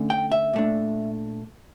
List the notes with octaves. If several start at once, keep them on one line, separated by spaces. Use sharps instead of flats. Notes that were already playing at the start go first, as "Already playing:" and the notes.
Already playing: D3 A3 C#4
G5
E5
A#2 A3 D4